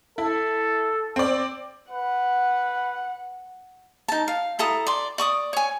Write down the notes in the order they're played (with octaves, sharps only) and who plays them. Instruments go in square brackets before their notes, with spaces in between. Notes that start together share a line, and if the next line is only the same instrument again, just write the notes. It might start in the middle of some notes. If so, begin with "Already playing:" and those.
[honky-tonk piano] E4 [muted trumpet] A4
[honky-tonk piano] C4 D5
[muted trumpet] B4 [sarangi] F#5
[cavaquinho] D#4 A5
F5
E4 A4 A#5 D#6
D5 C6
D5 C#6 D#6
C#5 G#5